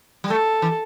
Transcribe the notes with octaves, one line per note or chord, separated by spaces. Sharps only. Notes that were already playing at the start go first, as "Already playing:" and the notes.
G3
A3 A4
E3